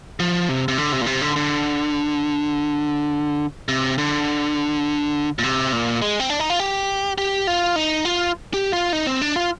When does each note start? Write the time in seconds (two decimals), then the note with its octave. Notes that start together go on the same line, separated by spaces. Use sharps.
0.20 F3
0.49 C3
0.68 C3
0.78 D3
0.92 C3
1.01 A#2
1.06 C3
1.21 D3
1.36 D3
3.68 C3
3.98 D3
5.39 A#2
5.43 C3
5.73 A#2
6.02 G#3
6.20 C4
6.30 D4
6.40 D#4
6.50 F4
6.60 G4
7.18 G4
7.47 F4
7.76 D#4
8.05 F4
8.54 G4
8.73 F4
8.93 D#4
9.07 C4
9.22 D4
9.36 F4